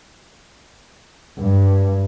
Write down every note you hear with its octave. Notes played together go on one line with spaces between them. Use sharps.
G2